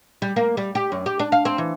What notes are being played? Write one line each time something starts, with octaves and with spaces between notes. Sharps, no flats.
G3
A#3
G3
G4
F#2
G4
D4
F5
C4
E3